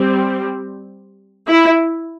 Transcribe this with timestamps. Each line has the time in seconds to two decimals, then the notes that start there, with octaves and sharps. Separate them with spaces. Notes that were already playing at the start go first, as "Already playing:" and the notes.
Already playing: G3 C4
1.47 E4